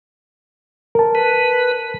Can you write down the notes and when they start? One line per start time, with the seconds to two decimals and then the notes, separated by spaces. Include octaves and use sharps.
0.95 A#4 A5
1.15 B4